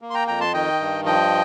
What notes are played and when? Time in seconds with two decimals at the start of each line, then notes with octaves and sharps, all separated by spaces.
0.01 A#3
0.10 C6
0.15 G5 A#5
0.27 F2 G5 A#5
0.40 A5 C6
0.53 D#3 D#5 G5
0.80 G2
1.05 F3 D#5 G5